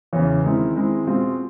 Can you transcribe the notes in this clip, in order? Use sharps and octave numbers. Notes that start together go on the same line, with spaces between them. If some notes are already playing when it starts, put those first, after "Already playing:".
E2 C#3 E3
D#3 G#3 C4 E4
D#3 G#3 C4 E4
B2 G#3 C4 F4